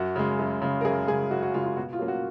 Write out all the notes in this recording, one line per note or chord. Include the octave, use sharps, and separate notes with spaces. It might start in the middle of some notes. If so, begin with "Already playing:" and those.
Already playing: F#2 F#4
C#3 G#3
F#2
C#3 G#3
A#4
F#2 G#4
C#3 G#3 G#4
F#2 F#4
F#4
C#3 G#3 F4
F4
B2 F#4
F4
F#3 A#3 C#4
F#4